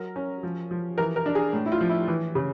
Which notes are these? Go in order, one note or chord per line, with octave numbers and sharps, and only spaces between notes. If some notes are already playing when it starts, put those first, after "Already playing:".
Already playing: F#3 A#4
C#4
F3
F3
E3 A#4
A#4
D4
G#4
A2
E4
F4
F3
E4
E3
C#3